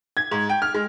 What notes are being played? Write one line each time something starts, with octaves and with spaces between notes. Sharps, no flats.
G#6
G#2
G5
F6
G#3